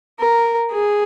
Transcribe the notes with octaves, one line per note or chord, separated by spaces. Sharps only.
A#4
G#4